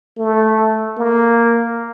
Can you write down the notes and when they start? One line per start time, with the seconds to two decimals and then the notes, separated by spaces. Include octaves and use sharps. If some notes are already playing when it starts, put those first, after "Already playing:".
0.18 A3
0.97 A#3